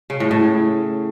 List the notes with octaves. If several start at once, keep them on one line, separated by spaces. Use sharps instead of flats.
C#3
A2
A2